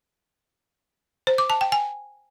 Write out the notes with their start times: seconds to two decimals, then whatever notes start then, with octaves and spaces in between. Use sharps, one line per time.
1.27 C5
1.38 D6
1.50 A5
1.61 G5
1.72 G#5